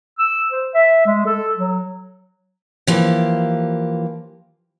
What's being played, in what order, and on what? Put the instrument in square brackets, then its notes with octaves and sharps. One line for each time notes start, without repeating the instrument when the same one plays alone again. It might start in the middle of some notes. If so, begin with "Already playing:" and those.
[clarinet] E6
C5
E5
G#3
A4
F#3
[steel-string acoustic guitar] E3 F3 A#3 G4